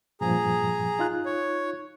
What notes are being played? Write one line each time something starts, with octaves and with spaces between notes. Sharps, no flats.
G2 A#2 F3 G#4 A#5
D#4 F4 F#6
C#5